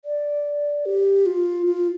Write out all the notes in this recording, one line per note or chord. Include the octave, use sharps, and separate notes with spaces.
D5
G4
F4
F4